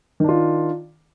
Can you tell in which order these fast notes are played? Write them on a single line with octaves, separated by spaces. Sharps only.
D#3 D4 F4